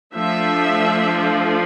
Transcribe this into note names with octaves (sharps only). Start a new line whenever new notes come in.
F3 A3 D4 E5